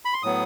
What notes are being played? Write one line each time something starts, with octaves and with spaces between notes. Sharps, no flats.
B5
C6
A2 F#3 B3 D#6